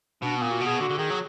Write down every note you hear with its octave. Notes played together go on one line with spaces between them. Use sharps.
B2 D4
A#2 B3
F#4
B2 G#4
D3 F#4
D3
D#3 G#4
F#3